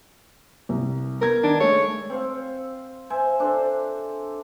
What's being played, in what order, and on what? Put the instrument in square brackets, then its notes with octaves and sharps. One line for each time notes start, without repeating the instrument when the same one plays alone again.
[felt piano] C2
[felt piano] B3 G#6 [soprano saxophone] A#4
[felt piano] D#3 [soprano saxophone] D4
[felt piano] G#3 A3 [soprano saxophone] C#5
[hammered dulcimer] C4 F5
C5 E5 G#5
D4 A4 C5